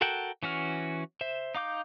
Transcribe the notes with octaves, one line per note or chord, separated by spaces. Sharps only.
F#4 A4 A#4 F#5 G5
E3 C#4 F#4 F6
C5 E5
D#4 F5 D6 G6